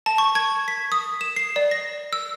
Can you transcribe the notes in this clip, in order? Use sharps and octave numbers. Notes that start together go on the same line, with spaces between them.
A5
C#6
G#6
B6
D#6
E7
C7
D5
A#6
E6